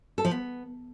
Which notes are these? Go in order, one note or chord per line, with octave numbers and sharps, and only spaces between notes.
A4
F3
B3